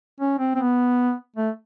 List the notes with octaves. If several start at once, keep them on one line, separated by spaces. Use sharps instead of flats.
C#4
C4
C4
B3
A3